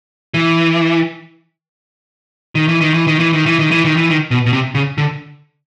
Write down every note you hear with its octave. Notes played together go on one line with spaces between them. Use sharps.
E3
D#3
E3
D#3
E3
D#3
E3
D#3
E3
D#3
E3
D#3
E3
D#3
B2
B2
C3
C#3
D3